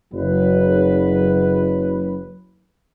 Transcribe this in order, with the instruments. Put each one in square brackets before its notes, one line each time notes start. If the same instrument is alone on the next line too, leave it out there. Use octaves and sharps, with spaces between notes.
[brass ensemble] F#1 F#3 B4